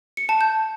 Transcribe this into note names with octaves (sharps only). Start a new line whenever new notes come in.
C#7
A5
G6